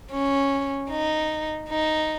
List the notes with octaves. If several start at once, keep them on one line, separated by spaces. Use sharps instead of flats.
C#4
D#4
D#4